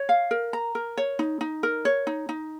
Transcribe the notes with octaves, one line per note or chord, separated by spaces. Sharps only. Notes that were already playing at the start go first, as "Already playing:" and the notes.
Already playing: C#5
F5
A#4
A#5
A#4
C#5
D#4
D#4
A#4
C#5
D#4
D#4